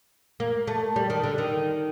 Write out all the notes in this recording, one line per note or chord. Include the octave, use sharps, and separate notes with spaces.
A#3
A3
G3
D#3
D3
D#3